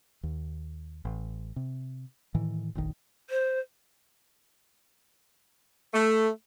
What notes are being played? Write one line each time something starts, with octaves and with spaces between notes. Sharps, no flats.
D#2
A1
C3
A2 D#3 E3
F1 A#1 D#3
C5
A3